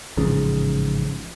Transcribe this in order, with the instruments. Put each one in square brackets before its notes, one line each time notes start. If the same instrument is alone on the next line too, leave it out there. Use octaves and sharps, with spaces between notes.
[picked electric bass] A1 G#2 C#3 F3